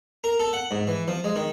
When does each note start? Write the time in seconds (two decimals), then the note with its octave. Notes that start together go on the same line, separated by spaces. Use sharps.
0.24 A#4
0.40 A4
0.53 F#5
0.71 G#2
0.87 E3
1.08 F3
1.24 G#3
1.36 D#3